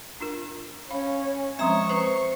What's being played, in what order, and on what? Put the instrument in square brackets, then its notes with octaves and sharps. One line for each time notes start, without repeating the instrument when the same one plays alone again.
[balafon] D4 F4 A#4
[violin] C#4 [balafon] F5 B5
[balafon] F3 G#3 C4 [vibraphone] E5 A#5 D#6 [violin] C#6
[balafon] B4 A#5 [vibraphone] C5